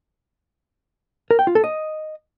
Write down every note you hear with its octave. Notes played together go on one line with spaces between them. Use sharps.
A#4
G5
F4
A4
D#5